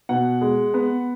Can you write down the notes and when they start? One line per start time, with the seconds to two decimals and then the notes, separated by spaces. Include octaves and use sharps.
0.09 B2 F#5
0.41 G#3
0.74 B3